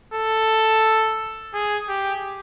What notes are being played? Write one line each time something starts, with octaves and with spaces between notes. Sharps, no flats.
A4
G#4
G4